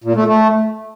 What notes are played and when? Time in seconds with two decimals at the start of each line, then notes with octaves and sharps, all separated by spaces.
0.04 A#2
0.16 A3
0.27 A3